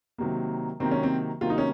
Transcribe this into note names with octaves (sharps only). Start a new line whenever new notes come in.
C3 D#3 F#3 A#3
C3 D#3 F#3 A#3 C4
C#4
C4
C3 D#3 F#3 A#3 F4
D#4
C#4